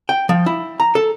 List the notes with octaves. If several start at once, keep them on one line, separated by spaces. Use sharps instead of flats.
G5
F3
E4
A#5
A4